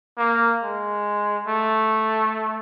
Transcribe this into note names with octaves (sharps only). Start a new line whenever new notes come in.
A#3
G#3
A3